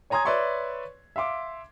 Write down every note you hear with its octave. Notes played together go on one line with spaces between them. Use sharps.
C#5 G#5 A#5 C6 D#6 G#6
B4 C#5 D5 E5 C6 C#6
E5 F5 C6 D6